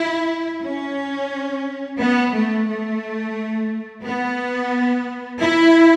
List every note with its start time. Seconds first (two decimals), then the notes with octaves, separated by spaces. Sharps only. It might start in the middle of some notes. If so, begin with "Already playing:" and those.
Already playing: E4
0.63 C#4
1.99 B3
2.34 A3
2.67 A3
4.04 B3
5.39 E4